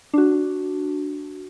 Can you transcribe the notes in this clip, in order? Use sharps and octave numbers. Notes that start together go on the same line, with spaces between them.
D4 F#4